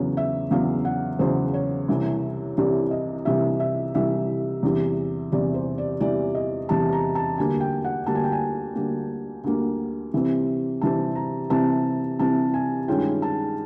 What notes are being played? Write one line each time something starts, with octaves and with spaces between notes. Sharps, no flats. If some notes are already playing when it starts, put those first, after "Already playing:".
Already playing: E2 C#3 F#3 B3 C#5
E5
E2 C#3 F#3 B3 F5
F#5
E2 C#3 F#3 B3 C5
C#5
C2 C3 E3 G3
C2 C3 E3 G3 D5
D#5
C2 C3 E3 G3 E5
E5
C2 C3 E3 G3 E5
E2 C3 E3 G3
E2 C3 E3 G3 D5
C5
D5
E2 C3 E3 G3 D5
D#5
E2 C3 E3 G3 A5
A#5
A5
D2 D3 G3 A#3 G#5
G5
F#5
D2 D3 G3 A#3 A5
G#5
G5
G#5
D2 D3 G3 A#3
D2 D3 G3 A#3
C3 E3 G3 C4
C3 E3 G3 C4 A5
A#5
C3 E3 G3 C4 A5
C3 E3 G3 C4 A5
G#5
G2 D#3 G#3 C#4 F4 G5
A5